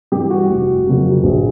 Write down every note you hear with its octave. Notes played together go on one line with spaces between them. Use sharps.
G2 E3 G4
F#4
F1
F2 C#3 F#3 A#3
A#1